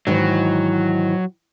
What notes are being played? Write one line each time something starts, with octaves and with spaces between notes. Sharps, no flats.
G#2 D#3 E3 F#3